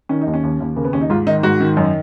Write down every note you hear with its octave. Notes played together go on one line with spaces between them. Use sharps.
D#3 C#4
D#4
D#2
C#4
D#2
D#2
C#3 A#3
B3
D#2 C#4
D#4
G#2 F4
D#3 D#4
G#2 F#4
D#3
F#2 D#4